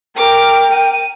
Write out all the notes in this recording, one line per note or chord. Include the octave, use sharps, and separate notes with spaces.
A#4 G5 D6
D#7